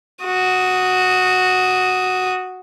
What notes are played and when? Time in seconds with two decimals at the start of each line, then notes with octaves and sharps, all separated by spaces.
0.24 F#4 D#6